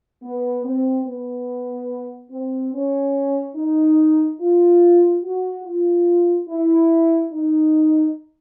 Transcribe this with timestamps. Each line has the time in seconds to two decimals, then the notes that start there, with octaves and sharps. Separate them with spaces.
0.23 B3
0.64 C4
1.06 B3
2.31 C4
2.73 C#4
3.56 D#4
4.40 F4
5.24 F#4
5.65 F4
6.48 E4
7.32 D#4